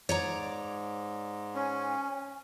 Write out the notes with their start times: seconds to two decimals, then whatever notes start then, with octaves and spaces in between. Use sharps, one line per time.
0.09 G#2 C#5 D5 A#5
1.55 C#4 G#5